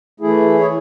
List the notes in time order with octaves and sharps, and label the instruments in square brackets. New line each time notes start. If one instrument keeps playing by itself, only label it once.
[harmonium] E3 A3 E4 G#4
C#5